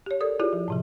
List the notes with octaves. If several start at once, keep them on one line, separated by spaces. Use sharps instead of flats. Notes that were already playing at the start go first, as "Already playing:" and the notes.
G4 C#5
A4 A#4 D5 D#6
E4 F4 G4 G#4 C#5 D5
F3
A2 C3 F3